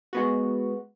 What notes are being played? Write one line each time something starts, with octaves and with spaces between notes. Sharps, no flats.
G#3 B3 F#4